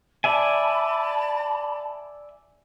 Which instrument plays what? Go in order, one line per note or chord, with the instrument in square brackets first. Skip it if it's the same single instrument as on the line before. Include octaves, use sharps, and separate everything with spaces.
[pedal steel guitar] D5 E5 G#5 [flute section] A5 B5